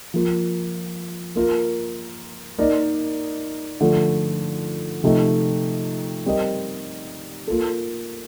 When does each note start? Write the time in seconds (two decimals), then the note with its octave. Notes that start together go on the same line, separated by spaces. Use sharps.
0.14 F3 A#3 F4
1.35 A#3 F4 A#4
2.58 A#3 D#4 A#4 D5
3.81 D3 F3 A3
5.04 C3 F3 A3 D#4
6.26 G3 C4 G4 A#4 D#5
7.48 A#3 F4 A4